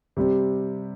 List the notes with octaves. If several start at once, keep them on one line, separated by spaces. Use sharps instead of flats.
C3 G3 C4